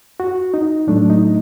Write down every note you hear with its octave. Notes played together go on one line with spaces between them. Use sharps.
F#4
D#4
A2 F#3 A3 D4
D#4